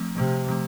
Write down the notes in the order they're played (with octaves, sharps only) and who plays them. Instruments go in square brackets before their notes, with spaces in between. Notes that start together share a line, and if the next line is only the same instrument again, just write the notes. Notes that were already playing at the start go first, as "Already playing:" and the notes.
Already playing: [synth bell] F3 A3 C4
[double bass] C3 [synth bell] F3 A3 C4
[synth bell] F3 A3